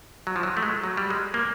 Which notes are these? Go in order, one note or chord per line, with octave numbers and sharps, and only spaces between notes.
F#3
F3
F#3
A3
G#3
F#3
G3
G#3
A#3